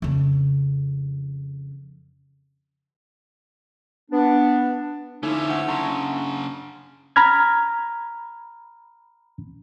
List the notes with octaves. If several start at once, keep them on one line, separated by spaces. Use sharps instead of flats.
F2 C#3
B3 D4
D3 F3 A3 C#4 D#4 E4
D4 F#5
C#3 F#3 A5 A#5 C6
A#5 B5 F6 G#6